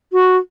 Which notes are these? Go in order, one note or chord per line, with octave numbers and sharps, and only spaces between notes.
F#4